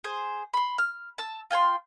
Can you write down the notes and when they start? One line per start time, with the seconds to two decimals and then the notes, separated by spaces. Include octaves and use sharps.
0.04 G#4 C5
0.53 B5 C6
0.78 F6
1.18 A5 E6
1.51 F4 G5 G#5 C6